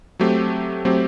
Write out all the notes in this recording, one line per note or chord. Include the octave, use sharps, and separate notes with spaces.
F#3 A3 C4 G4
F#3 A3 C4 G4